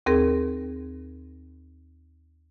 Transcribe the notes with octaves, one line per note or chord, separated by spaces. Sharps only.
D#2 C4 G#4 A#4